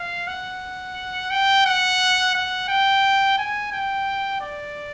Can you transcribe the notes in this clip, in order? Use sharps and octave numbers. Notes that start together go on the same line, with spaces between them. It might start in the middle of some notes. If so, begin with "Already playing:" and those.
Already playing: F5
F#5
G5
F#5
F#5
G5
G#5
G5
D5